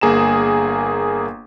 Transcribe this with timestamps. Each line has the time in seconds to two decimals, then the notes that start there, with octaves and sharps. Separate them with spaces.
0.01 G1 A#3 G#4 A#5 E7